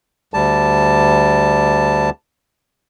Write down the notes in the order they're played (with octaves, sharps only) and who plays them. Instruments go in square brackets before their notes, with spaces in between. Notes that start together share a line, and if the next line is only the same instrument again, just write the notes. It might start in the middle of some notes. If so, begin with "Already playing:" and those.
[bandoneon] D2 G3 A5